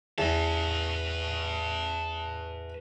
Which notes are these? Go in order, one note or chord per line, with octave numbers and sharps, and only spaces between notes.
E2 B4 A5